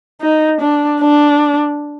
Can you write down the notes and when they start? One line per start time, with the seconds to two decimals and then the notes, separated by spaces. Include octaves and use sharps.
0.21 D#4
0.61 D4
1.01 D4